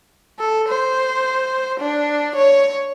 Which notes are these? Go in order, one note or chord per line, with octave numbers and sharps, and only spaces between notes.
A4
C5
D4
C#5